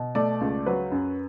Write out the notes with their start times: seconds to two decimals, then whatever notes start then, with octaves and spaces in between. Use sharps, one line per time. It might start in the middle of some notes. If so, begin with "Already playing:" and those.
Already playing: B2
0.15 A3 D5
0.41 C#2
0.66 F#3 B4
0.92 F#2